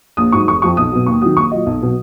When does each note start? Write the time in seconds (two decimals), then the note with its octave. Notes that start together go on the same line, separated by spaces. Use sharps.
0.17 A#1 D#6
0.32 G#2 F#3 C#6
0.47 F1 C#6
0.62 F2 F3 C#6
0.77 B1 D#6
0.92 B2 F#3
1.06 D#2 C#6
1.22 D#3 F#3 D#6
1.36 A#1 C#6
1.51 A#2 F#3 D#5
1.66 B1
1.82 B2 F#3